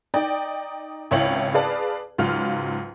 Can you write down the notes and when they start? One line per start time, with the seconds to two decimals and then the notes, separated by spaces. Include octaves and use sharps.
0.14 D#4 D5 G5
1.11 G#1 C#2 E4 C#5 G5 F#7
1.54 G#4 B4 D5 F5 A5
2.18 C#2 G#2 F#3 F4 F6